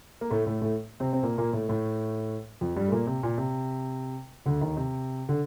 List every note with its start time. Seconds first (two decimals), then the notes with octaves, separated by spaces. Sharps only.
0.21 A#3
0.30 A2 A3
0.45 A2 A3
0.61 A2 A3
1.00 C3 C4
1.13 C4
1.23 A#2 A#3
1.38 A#2 A#3
1.53 A2 A3
1.69 A2 A3
2.61 F2 F3
2.76 G2 G3
2.88 A3
2.92 A#2 A#3
3.07 C3
3.23 A#2
3.38 C3
4.46 D2 D3
4.61 D#2 D#3
4.77 C3
5.29 D3